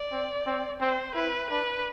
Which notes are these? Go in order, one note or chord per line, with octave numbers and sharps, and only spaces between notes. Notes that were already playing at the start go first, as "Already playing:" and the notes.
Already playing: D5
C4
C4
C4 C5
E4 B4
D4 B4